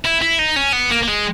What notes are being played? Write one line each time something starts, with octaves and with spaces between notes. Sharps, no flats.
E4
E4
D#4
C#4
B3
A#3
A#3
G#3